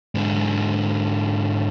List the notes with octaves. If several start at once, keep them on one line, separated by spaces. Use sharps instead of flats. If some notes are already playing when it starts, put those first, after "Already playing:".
G#2 D3